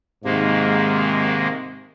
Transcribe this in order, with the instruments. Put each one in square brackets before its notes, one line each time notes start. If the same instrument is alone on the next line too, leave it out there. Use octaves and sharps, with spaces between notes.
[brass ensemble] G#2 [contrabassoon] C3 [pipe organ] D#3 G#3 A#3